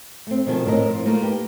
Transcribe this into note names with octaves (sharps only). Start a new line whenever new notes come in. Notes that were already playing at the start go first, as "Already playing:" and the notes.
A3 C4
B2 D#3 F3 A4 G#5
A2 C4 A#4 D#5
F3 F4
A3 A#3 D#4 F4 A#4
G4 B4